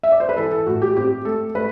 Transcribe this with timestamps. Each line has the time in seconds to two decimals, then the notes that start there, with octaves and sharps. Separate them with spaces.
0.03 E5
0.12 D5
0.20 C5
0.29 B4
0.37 E3 A4
0.51 A4
0.67 A2 F#4
0.82 G4
0.96 C4 G4
1.25 A3 A4
1.55 A3 B4